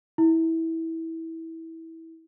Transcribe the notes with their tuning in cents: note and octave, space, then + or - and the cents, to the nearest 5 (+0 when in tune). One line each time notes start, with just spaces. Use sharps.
E4 -20